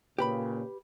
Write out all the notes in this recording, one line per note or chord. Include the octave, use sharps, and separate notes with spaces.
A#2 C#3 G4 B4 B5